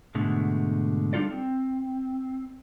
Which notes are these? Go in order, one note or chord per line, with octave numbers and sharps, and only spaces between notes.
G#2 B2 D3 G#3 A3
G3 D4 D#4 F4 A4 D5
C4